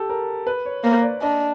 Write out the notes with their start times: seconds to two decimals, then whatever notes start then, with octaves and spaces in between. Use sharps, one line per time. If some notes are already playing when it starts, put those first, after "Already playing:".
Already playing: G4 A4
0.09 A#4
0.47 B4
0.65 C#5
0.83 A#3 C5
1.02 D5
1.22 D4 D#5